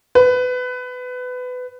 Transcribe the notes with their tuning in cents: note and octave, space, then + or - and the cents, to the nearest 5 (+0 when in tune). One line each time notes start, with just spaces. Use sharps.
B4 +20